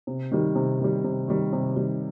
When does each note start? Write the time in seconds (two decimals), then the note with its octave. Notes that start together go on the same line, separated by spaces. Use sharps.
0.07 C3
0.32 D#3 G3
0.55 C3
0.79 D#3 G3
1.04 C3
1.28 D#3 G3
1.53 C3
1.76 D#3 G3